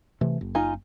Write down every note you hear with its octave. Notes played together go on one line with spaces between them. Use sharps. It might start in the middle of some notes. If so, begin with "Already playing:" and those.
C3 E3 A3
F#1
D#4 F4 G#5